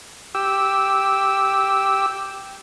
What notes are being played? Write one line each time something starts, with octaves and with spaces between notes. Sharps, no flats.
G4 E6